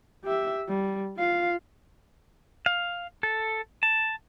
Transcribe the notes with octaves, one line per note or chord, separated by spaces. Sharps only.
G4 E5
G3
F4 F5
F5
A4
A5